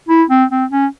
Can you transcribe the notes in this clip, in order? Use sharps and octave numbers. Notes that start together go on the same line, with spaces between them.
E4
C4
C4
C#4